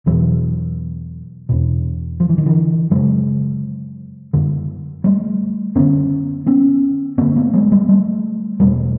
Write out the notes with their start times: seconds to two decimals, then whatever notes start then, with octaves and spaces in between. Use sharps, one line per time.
0.06 E2 B2 E3 F#3
1.49 E2 B2
2.20 F3
2.29 E3
2.38 D#3
2.46 D3 E3
2.91 F#2 C#3 F#3 G#3
4.33 F#2 D3
5.04 G3 A3
5.75 F#2 D3 B3 C#4
6.46 B3 C#4
7.18 G2 D3 A#3 C4
7.36 A3 B3
7.53 F#3 G#3
7.72 G3 A3
7.89 G3 A3
8.60 E2 B2 G3 A3